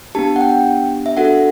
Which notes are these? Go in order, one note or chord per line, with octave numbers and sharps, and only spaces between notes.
B3 D4 G4 A5
F#5
G5
E5
D4 F#4 A4 F#5